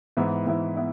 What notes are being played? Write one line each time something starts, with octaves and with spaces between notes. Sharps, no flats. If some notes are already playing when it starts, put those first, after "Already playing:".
G#2 E3 B3 E4 E5
G#2 E3 B3 E4
B3 E4